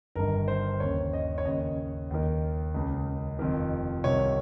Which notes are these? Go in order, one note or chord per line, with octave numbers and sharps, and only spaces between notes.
G1 G2 D#3 A#4
C5
D#2 C#3 C#5
D#5
C#5
D#2 C#3 D#5
D#2 D#3
C#2 C#3
F1 F2 D#3
C2 C3 D#3 C#5